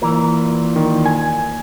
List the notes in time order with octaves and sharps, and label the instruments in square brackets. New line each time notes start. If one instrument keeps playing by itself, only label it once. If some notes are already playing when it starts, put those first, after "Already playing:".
[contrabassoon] A#2 [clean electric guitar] E3 A#4
[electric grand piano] D#3
G#5